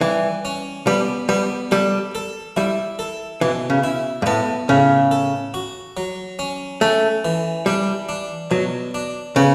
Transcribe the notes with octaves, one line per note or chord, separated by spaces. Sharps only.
E3 G3
C#4
G3 B3
G3 B3
G3 A4
A4
G3 E4
A4
B2 E3
C#3
E4
G2
A2 B3
A2 C#3
A4
F#4
F#3
C#4
A3 C#4
E3
G3 D4
D4
B2 F#3
D4
C#3 B3